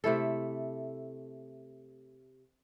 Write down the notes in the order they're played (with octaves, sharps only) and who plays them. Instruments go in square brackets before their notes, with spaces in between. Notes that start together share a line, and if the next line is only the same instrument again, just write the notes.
[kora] C3 A3 E4 A4